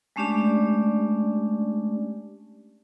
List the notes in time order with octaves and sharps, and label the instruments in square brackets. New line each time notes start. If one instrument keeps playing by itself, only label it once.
[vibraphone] G#3 A3 C#4 D4 G4 D5